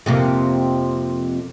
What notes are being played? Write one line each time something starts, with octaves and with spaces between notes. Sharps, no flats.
F2 C3 A#3